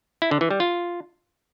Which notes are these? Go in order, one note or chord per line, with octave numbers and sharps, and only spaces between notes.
E4
D3
E3
G3
F4